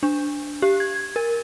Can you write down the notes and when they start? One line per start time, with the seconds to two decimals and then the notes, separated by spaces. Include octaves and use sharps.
0.03 D4
0.62 G4
0.80 G#6
1.16 A#4